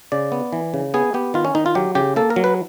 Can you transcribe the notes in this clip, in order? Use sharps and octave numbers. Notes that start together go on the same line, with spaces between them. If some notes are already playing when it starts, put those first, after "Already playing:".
C#3 D5
B3
E3
C#3
B3 G#4
B3 G4
D#3 F4
C#4
D#3 D#4
F4
F#3 G4
C#3 G4
A#3 A4
A#4
F#3
B4